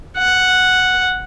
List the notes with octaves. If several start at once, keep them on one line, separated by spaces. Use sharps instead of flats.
F#5